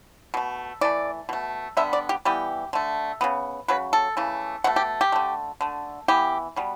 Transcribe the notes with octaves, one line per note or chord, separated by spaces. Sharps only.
B2 A3
E3 A3 D5
B2 A3
D3 G3 B3 E5
D5
G4
E3 G3 B3 G4
D3 A3
C#3 G3 B3
C#3 F#3 B4
A4
C#3 E3 A3
B2 A3 F#5
G4
G4
D3 A3
D3 A3
E3 B3 G4
B2 G3 B3